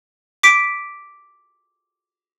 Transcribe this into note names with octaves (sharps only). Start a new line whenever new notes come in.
D6 B6 D7